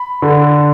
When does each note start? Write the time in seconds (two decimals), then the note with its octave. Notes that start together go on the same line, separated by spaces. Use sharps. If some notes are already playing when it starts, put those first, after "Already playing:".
Already playing: B5
0.22 D3